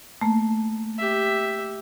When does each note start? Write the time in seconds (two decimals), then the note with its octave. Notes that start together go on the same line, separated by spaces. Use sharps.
0.21 A3 A#3
0.98 G4 E5